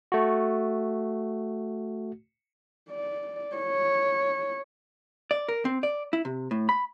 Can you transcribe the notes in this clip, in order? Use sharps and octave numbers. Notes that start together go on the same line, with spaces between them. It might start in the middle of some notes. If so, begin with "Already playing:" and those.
A3 F#4
D5
C#5
D5
A#4
C4
D5
E4
C3
A2
B5